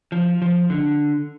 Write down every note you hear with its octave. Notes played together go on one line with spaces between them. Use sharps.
F3
F3
D3